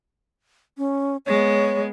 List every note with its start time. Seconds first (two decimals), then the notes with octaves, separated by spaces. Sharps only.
0.78 C#4
1.26 G#3 B3 C#5